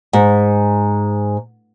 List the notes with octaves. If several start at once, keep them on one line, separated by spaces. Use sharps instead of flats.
G#2